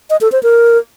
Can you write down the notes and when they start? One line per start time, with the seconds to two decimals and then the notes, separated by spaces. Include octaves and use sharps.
0.10 D#5
0.21 A4
0.32 C5
0.43 A#4